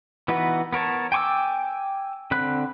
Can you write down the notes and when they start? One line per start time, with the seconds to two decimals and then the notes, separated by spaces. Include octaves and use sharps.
0.28 E3 B3 D#4 F#4 B4
0.73 B3 A#4 C#5 A5
1.12 G5 G#5 C#6 D6 E6
2.31 D3 C4 B5 F#6